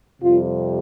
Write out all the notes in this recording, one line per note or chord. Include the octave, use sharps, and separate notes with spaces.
F2 C3 G3 F4